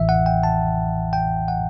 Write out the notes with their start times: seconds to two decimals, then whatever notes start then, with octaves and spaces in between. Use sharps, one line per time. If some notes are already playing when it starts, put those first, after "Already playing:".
Already playing: A1 A2 E3 E5
0.09 F#5
0.26 G5
0.44 A5
1.13 G5
1.48 F#5